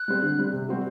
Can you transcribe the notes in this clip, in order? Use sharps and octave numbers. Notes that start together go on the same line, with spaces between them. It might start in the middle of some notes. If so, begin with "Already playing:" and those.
Already playing: F#6
G3 C4
D3
G3 C4
C3
G3 C4 F#4